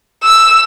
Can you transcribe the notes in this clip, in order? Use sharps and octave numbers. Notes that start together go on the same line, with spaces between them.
E6